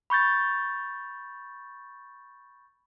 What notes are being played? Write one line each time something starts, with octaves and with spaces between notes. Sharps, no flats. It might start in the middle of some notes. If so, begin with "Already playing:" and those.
B5 C#6 G6 A6